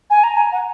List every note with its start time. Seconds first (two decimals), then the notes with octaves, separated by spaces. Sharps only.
0.10 G#5
0.23 A#5
0.37 G#5
0.52 F#5